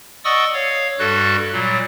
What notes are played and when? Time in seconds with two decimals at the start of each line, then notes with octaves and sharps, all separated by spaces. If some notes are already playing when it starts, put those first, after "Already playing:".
0.25 D5 D#5 F#5 C#6 D#6 E6
0.53 C#5 F5
0.99 G2 G3 F#4 A4 F#6
1.53 A#2 F#3 G3